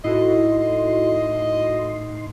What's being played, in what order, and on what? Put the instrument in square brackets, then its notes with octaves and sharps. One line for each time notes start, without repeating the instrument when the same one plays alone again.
[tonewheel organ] A2 D#4 C6 [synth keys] E4 F#4 A4 [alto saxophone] D#5